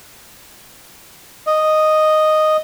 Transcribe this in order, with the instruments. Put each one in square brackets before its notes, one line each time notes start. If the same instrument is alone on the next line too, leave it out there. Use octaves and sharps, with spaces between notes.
[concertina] D#5